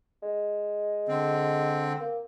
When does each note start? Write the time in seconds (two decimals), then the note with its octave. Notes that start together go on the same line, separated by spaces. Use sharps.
0.23 G#3
1.09 D3 C4
2.00 A#3